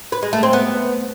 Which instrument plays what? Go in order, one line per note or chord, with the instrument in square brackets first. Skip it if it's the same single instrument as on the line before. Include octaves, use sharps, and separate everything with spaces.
[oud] B4
G#3
A3
C4
B3